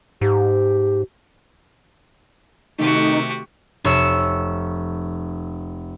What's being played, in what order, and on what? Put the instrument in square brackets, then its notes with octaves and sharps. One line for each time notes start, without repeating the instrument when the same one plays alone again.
[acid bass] G#2 [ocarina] G4
[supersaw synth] C3 D#3 A3 [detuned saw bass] D#4 [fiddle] F#4 G4
[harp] F1 C#5 E6